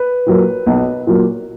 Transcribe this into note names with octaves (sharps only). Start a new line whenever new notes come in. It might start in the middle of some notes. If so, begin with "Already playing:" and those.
Already playing: B4
A#2 F#3 A#3
B1
A#2 F#3 A#3